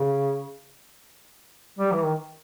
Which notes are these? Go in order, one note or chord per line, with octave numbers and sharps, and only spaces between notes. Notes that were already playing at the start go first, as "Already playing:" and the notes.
Already playing: C#3
G3
E3
D#3